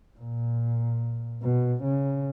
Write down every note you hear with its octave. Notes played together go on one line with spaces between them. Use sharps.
A#2
B2
C#3